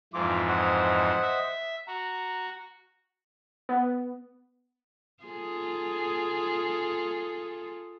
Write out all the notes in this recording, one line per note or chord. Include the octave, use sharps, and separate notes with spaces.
F2 G#2 E3 F4 D6
C5 D#5 F#5
E5
F#4 A#5
B3
F4 G#4 A4